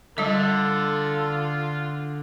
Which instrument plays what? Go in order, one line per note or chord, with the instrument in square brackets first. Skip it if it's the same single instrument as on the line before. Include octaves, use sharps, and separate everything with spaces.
[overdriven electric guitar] D3 [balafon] G3 D#5 [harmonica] F4 [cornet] A4